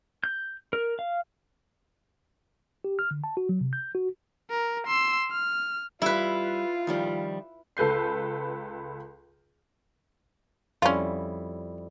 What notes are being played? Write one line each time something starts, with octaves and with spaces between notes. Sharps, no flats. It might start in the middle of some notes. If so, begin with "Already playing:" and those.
G6
A#4
F5
G4
F6
D3
A5
F#4
F#3
C3
G6
F#4
A#4
C6 E6
F6
G3 E4 F4 B4
D#3 F3 G3
C#2 A4 B4 G6 C7
F2 G3 C#4 E4 F4